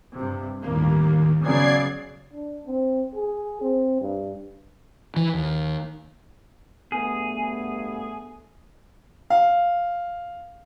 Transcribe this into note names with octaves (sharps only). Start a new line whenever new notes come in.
G2 C3
G1 D#2 A2 A#3
C#3 F#3 B3 D5 G#6 C7
D4
C4
G#4
C4
G2
E3
D#2
G2 A3 B3 G#4
F5